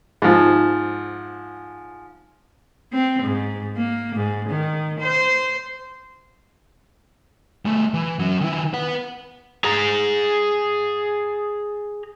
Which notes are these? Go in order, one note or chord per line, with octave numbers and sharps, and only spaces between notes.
G#2 F3
C4
G#2
A#3
G#2
D#3
C5
G3 A3
E3
F#3 C#4
D#3 E4
B4 F#5
G#4 A#5